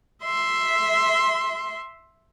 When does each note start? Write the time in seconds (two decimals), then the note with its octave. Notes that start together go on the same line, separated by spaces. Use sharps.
0.24 E5 C6